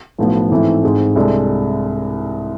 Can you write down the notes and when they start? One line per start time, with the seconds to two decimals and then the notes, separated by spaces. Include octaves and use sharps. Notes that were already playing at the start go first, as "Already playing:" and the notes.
0.18 B1 A2 F3 B3 F4
0.50 G#2 E3 A3 C4 E4
0.83 G#2 G#3 C4
1.16 C2 C3 G#3 D4 A4